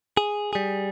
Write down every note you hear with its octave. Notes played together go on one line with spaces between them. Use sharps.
G#4
G3 G#4